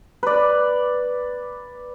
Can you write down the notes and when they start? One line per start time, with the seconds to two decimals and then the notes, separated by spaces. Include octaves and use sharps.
0.23 B4 D5